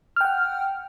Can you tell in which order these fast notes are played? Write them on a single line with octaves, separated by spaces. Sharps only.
F6 G5 F#5